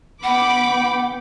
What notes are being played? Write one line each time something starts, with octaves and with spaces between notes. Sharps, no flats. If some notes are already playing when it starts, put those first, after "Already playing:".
B3 F#5 G5 B5 D6